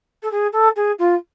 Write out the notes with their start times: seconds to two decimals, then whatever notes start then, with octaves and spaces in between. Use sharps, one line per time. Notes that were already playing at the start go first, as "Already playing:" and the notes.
0.22 A4
0.31 G#4
0.52 A4
0.76 G#4
0.99 F4